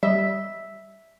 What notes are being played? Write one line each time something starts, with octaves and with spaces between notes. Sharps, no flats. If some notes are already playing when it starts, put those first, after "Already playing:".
G3 D#5 E5